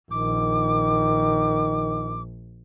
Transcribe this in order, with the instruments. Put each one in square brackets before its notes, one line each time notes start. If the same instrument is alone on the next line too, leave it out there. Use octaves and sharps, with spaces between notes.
[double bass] A#1 [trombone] D#3 [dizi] D6